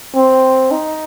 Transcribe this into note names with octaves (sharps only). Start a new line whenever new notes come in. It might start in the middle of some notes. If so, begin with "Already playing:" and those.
C4
D#4